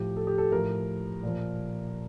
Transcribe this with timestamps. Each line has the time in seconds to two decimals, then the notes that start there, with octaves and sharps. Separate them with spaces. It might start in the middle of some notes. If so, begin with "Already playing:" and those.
Already playing: A2 F3 G4
0.17 A4
0.27 G4
0.38 A4
0.52 A2 F3 A#4
1.23 A#2 F3